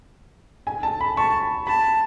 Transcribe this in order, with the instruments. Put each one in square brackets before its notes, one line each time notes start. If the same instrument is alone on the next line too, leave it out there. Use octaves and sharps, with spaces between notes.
[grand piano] G#5
A5
B5
[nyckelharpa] A5 [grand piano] C#6
[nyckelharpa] A5 [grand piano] B5